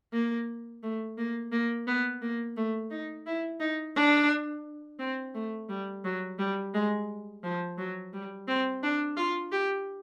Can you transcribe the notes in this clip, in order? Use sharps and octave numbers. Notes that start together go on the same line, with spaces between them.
A#3
A3
A#3
A#3
B3
A#3
A3
D#4
E4
D#4
D4
C4
A3
G3
F#3
G3
G#3
F3
F#3
G3
C4
D4
F4
G4